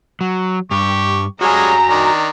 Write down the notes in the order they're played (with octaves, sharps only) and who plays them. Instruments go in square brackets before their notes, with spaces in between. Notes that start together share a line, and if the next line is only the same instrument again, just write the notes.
[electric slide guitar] F#3
[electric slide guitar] G2 [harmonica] G4 C#6
[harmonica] G3 G#3 C#5 [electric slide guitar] F#4 G#5 [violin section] A#5
[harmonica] D#3 D4